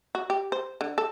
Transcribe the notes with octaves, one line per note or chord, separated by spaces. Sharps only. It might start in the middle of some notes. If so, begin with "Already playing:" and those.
F#4
G4
C5
D3
A4